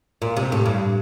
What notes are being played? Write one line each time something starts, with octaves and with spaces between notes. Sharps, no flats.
A#2
C3
A2
G2